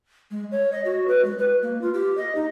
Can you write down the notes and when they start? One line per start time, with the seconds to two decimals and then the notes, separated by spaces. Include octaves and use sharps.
0.31 G#3
0.52 C#5
0.72 D#5
0.85 F#4
1.08 B4
1.25 G#3
1.38 B4
1.62 A#3
1.81 F4
1.94 G4
2.17 D#5
2.35 D#4